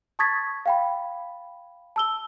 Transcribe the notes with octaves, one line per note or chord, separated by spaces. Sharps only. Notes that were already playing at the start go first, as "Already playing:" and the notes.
A5 C#6 D#6 G#6 A6 B6
F5 G5 B5
A5 E6 G7